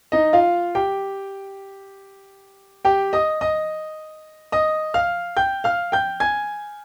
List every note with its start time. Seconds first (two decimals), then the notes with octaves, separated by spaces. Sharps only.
0.12 D#4 D#5
0.33 F4 F5
0.75 G4 G5
2.85 G4 G5
3.13 D#5 D#6
3.41 D#5 D#6
4.52 D#5 D#6
4.94 F5 F6
5.37 G5 G6
5.64 F5 F6
5.92 G5 G6
6.20 G#5 G#6